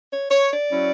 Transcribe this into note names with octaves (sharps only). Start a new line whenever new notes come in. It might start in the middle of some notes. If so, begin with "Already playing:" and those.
C#5
C#5
D5
F#3 C#4 E4